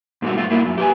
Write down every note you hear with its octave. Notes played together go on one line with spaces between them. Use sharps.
G#2 B2 G3 F#4
G2 A3 F4
A#2 A#3 E4
F#2
G4 B4 G#5